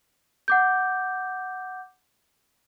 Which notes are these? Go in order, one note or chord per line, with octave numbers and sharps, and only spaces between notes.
F#5 D6 G6